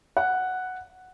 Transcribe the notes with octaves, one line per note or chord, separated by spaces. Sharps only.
F#5